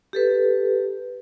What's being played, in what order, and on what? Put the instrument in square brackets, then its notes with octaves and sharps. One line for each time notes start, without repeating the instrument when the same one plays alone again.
[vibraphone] G4 A4 B4